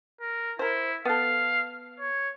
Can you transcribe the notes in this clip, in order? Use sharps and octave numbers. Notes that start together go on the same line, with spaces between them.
A#4
E4 A#4 C5
B3 A4 F5
C#5